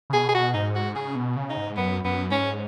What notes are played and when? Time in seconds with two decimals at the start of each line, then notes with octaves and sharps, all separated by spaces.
0.10 C#3
0.13 B2 G#4
0.29 G#4
0.35 F#4
0.54 G#2 D#4
0.75 F#4
0.95 C#3 G#4
1.15 B2
1.36 C#3
1.50 D#4
1.57 G#2
1.77 F#2 B3
2.04 F#2 B3
2.31 G#2 C#4